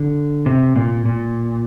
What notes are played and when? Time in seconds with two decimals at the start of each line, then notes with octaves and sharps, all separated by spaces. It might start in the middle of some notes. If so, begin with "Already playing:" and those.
Already playing: D3
0.46 C3
0.76 A#2
1.05 A#2